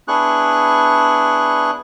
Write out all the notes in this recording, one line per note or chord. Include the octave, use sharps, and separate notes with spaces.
B3 D4 E4 G#4 C#6 F#6